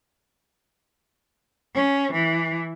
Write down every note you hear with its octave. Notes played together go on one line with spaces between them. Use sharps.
C#4
E3